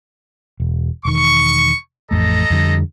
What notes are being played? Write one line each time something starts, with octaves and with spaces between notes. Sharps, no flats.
E1
E1 D#3 C#6
A1 F2 A3 A4 D#5 A#5
F2 D3 G3